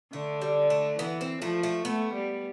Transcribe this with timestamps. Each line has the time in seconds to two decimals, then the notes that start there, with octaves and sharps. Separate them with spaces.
0.13 D3 A3
0.42 G3
0.70 A3
0.99 E3 B3
1.21 C4
1.41 F3 A3
1.63 A3
1.85 A3 B3
2.13 G3